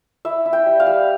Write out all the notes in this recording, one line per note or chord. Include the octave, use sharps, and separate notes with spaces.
E4 E5
E4
G5
G3
F5
G3